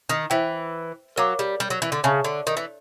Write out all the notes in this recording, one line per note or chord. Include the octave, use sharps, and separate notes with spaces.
D#3
E3 C5 E5 G5
F#3 A#4 C#5 F5 A#5 D6
G3
G3
F#3
E3
D3
C#3 C#5 E5 A5 C#6
D3
D#3
E3